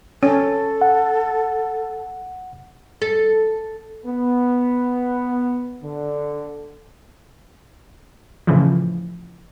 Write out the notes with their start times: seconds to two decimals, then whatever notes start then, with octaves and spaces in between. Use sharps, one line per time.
0.23 C#4 A4
0.81 F#5
3.02 A4
4.06 B3
5.82 D3
8.47 A2 C#3 E3 F3